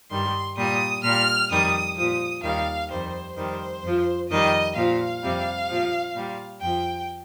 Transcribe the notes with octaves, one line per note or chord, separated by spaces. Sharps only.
G2 D#3 G3 C6
A#2 G3 D#6
A#2 G3 F6
F2 D#3 G3 D#6
A#2 F3 D#6
D#2 D#3 G3 F5
F2 D#3 G3 C5
F2 D#3 G3 C5
F2 F3
F2 D#3 G3 D#5
A#2 F3 F5
F2 C3 G3
A#2 F3
A#2 G3
F2 F3 G5